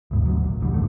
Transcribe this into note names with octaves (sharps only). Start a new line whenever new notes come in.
D2 G#2 B2
D2 F#3
A#1
E1 F2 D3 G3
G#2 D3 D#3 A3